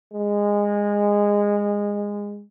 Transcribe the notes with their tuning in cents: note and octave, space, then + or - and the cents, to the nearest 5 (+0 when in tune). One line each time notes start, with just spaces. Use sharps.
G#3 -20